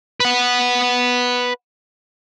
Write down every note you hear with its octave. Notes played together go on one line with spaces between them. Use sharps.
B4 F#5